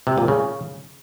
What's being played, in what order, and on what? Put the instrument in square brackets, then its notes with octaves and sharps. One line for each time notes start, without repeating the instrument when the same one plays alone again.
[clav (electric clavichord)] C3
A#2
C#3